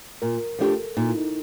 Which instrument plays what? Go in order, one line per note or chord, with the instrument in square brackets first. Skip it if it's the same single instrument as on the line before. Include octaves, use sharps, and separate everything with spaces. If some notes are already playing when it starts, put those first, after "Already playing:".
[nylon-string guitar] A#2 [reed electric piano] A#4
[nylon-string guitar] F3 A3 D4 G4 [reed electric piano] A4
[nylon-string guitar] A#2 [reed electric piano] D#4
[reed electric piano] E4
D#4